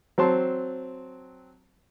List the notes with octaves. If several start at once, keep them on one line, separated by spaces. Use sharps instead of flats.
F#3 C4 A5 C6